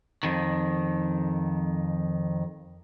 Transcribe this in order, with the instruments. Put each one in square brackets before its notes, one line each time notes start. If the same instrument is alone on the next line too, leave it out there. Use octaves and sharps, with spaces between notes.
[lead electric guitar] F2 D#3